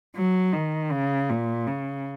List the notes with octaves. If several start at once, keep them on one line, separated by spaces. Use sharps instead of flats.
F#3
D#3
C#3
A#2
C#3